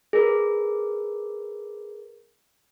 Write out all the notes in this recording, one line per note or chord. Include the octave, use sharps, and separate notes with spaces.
G#4 A#4 B4